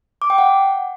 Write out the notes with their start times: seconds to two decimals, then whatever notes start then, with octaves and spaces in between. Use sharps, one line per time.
0.22 D6
0.30 G5
0.38 F#5